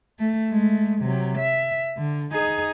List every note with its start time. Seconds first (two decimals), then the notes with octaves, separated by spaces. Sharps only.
0.19 A3
0.50 G#3 A3
1.02 C3 F#3
1.39 E5
1.97 D3
2.33 D#4 G#4